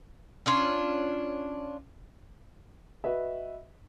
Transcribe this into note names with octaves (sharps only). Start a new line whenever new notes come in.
C#4 D4 F4
F#4 B4 D#5 E5